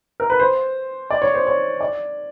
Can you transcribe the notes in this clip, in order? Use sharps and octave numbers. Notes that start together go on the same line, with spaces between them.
A#4
B4
C5
D5
C#5
C5
C#5
D5